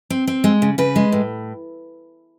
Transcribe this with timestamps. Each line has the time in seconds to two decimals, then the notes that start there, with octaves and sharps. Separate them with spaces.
0.10 C4
0.27 C4
0.44 G#3
0.62 C#3
0.78 C#3 B4
0.96 G#3
1.12 A2